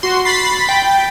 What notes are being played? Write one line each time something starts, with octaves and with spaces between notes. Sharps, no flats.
F#4 C6
B5 A6 B6 C7
G5